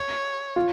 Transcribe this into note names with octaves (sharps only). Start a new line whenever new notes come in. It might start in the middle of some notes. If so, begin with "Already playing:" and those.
Already playing: C#5
F4